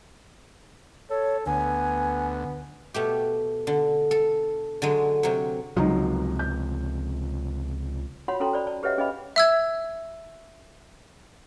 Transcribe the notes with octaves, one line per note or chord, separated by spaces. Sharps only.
A4 C#5
D2 B3 G#5
B2 A3 G4
D3
A4
D3 F#3 G#3
C3 F#3
C#2 C3 F3 F#3 D#4
G6
F4 F#4 C#5 F#5 B5 C6
C#4 F#4 A4 G5 A#5 C6
C5 D5 B5
D5 A5
G4 B4 C#5 D#5 E5 F#5
C#4 G#4 B4 D#5 F5 B5
E5 E6 G#6